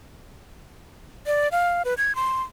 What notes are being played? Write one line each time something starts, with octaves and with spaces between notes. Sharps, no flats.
D5
F5
B4
G#6
C6